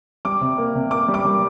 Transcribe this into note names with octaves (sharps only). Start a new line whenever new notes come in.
G3 D6
C3
A#3
C3
A#3 D6
G3
D6
G3